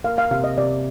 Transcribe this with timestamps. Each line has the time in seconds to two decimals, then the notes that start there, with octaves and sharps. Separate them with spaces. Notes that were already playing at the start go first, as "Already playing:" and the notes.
0.04 A#3 F5
0.18 F5
0.31 C3 F5
0.44 D#5
0.58 C3 D5